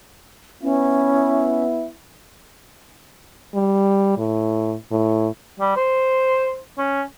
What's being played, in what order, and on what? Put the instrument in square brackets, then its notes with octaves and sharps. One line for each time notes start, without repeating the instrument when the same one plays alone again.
[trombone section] B3 E4 [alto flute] C#4
[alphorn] G3
A2
A2
[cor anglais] G3
C5
C#4